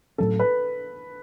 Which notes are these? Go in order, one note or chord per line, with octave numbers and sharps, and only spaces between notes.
A2 F#3 C#4 A4
B4